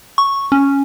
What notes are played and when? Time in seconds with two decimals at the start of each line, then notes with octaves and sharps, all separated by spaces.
0.18 C#6
0.52 C#4